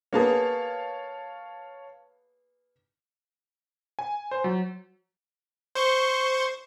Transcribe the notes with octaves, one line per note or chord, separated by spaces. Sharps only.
A#3 B3 G#4 C#5 F5 A5
G#5
C5
F#3
C5 C6 C#6